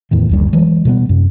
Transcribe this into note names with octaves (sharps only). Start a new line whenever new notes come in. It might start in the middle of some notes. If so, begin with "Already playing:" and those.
E2 A2 D#3
F#1 D2 G3
E3 F#3 G#3
B2 G3 G#3 B3
F#2 C3